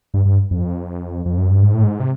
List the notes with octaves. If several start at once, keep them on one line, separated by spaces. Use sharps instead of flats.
G2
G2
F2
F2
F#2
G2
G#2
A2
G#2
C3